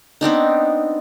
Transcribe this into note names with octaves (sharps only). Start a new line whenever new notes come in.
B3 C4 D4 D#4